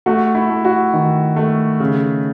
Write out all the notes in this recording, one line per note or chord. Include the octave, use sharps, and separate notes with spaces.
A3 F#4
E4
A3
F#4
D#3
A3
C#3